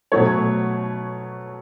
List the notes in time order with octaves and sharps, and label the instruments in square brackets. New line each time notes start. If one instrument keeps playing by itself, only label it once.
[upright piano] B2 F#3 A3 C#5